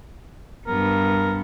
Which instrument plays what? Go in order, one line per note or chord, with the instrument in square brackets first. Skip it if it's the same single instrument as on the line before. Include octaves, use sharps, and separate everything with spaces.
[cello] G2 B3 [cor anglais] A#4